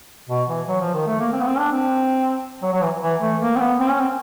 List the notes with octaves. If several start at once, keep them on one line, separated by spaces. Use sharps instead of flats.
B2
E3
F#3
F3
D#3
A3
A#3
C4
B3
C4
D4
C4
F#3
F#3
E3
E3
A3
A#3
C4
B3
C4
C#4
C4